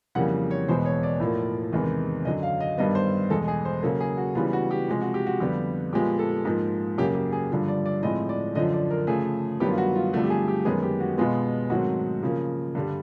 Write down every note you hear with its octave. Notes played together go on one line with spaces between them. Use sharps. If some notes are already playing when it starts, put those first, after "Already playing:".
F2 C#3 E3 G3 A#3 F#5
C#5
E2 B2 G#3 B3 C5
C#5
D5
A2 F3 A#3
E2 C3 D#3 G#3 B3
F#2 D3 F#3 D#5
F5
D#5
G2 D#3 G3 B3 D#5
C5
E2 B2 G#3 A4
G#4
C5
C#3 F#3 A#3 A4
G#4
F#4
C#3 E3 G3 B3 F4
F#4
G4
C3 F3 G#3
F#4
G4
F#4
F2 D3 G3 B3 G4
A#2 F3 G#3 B3 G4
A4
G#2 F3 A#3
F#2 C#3 F#3 A#3 G4
G4
G#4
G2 D3 F3
D5
D5
A2 F3 G#3 C4 D#5
D5
F#2 D3 F3 D#5
D5
A#4
C#3 F3 A3 G#4
G2 D#3 F#3 B3 G4
F4
F#4
F4
G2 D3 F3 A3 C4 F#4
G4
G#4
G4
F#2 D#3 G#3 B3 G#4
G4
F#4
B2 G#3 B3 F4
G#2 D#3 F#3 A3 C4 F#4
C#3 F3 A#3
G2 D3 G3